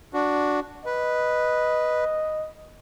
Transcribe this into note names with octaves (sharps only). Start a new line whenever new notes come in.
D4 F#4
B4 D#5